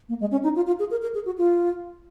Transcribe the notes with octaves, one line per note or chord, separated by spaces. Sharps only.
A#3
G#3
C#4
D#4
F4
F4
G#4
A#4
A#4
G#4
F#4
F4